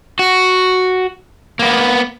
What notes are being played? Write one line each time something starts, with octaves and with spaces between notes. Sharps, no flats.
F#4
A#3 B3